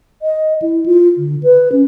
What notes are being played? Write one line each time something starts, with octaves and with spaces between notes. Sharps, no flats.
D#5
E4
F4
D3
B4
C#4